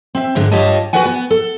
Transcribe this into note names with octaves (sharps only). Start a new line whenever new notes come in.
C4 E5
G#2 D3 G#3
G2 F4 G4 C#5 D#5 A5
F#4 G4 B4 D5 F#5 G#5
B3
A4